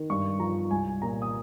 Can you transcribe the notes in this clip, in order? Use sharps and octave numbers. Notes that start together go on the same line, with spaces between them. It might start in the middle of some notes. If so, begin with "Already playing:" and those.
Already playing: D#3
G2 C#6
F3 A#5
C2 G#5
A#2 A#5
D#6